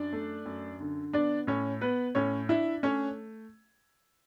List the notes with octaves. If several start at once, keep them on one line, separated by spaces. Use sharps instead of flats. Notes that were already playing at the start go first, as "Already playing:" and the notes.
Already playing: F#2 D4 D5
A3
F#2
D3
B3 D4 D5
A2 C#4 C#5
B3 B4
A2 C#4 C#5
D4 E4 E5
A3 C#4 C#5